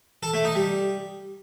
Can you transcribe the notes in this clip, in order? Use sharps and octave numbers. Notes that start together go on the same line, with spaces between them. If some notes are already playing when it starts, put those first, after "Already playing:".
A4
A3
D#4
G3